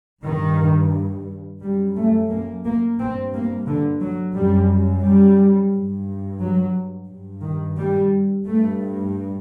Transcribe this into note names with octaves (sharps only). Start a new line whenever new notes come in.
G2 D#3
F#2 G3
A3
A#3
A#3
G2 C4
A#3
D3
F#3
F#2 G3
G3
G2
F#3
G2
D#3
G3
G2 A3